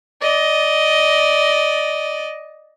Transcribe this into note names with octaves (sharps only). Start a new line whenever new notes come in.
D5 D#5